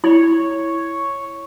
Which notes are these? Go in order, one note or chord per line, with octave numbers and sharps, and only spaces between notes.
E4 C#5